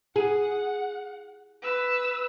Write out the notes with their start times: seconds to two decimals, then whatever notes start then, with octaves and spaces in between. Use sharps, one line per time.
0.16 G#4 F#5
1.62 B4 E6